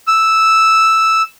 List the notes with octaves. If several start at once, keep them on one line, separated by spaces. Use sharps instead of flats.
E6